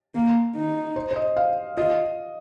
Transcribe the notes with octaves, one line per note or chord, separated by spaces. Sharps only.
A#3
D#4
C5
C5
D#5
F5
F4 D#5